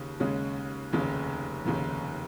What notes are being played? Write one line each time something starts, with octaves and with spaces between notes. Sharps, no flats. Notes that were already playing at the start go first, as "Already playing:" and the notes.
Already playing: D#2 C#3
D#2 C#3 G#3 C#4
F1 D#2 C#3
F1 D#2 C#3